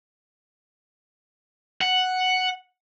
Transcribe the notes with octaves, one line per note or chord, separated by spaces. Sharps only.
F#5